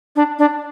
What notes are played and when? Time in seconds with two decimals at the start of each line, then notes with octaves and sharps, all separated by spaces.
0.16 D4
0.39 D4